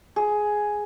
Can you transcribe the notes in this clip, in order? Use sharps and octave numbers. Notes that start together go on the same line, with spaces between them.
G#4